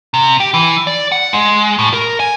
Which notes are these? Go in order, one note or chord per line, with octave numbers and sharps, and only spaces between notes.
C3
G4
E3
D5
F#5
G#3
A2
A#4
G#5